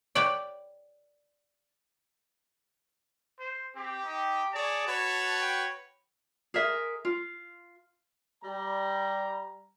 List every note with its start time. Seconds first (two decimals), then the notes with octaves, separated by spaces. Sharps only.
0.15 G4 B4 C#5 D5 F#5 G5
3.39 C5
3.75 C4 G4
4.04 D#4
4.53 G#4 C#5 D5 A5
4.87 F#4 B4 C#5
5.41 G5
6.54 G#4 A#4 E5
7.05 F4
8.43 G3 A#5